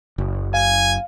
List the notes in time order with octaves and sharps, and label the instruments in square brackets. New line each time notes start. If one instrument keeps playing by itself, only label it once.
[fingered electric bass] F#1
[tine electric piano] F5 [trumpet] G#5